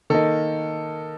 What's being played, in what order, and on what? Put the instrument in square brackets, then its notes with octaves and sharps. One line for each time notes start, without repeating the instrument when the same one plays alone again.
[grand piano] D#3 A#3 D#4 A4